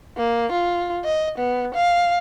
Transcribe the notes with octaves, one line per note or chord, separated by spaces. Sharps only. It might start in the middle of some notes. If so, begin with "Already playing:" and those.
A#3
F4
D#5
B3
F5